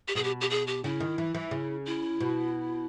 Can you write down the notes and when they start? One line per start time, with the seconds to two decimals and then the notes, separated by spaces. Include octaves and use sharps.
0.08 G4
0.15 B2 G#4
0.24 G4
0.41 G4
0.50 G#4
0.67 G4
0.84 C#3 E4
1.00 D#3
1.18 E3
1.34 E3
1.51 C#3
1.86 E4
2.20 B2